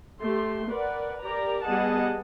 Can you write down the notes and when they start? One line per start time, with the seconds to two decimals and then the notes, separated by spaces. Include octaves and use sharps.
0.22 A3 G4 C6
0.68 A#4 B4 D5 F#5
1.21 G4 A#4 D5 A#5
1.65 G3 B3 G#4 D#5 F#5 A5